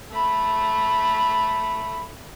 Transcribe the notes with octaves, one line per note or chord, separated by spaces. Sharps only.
A3 B5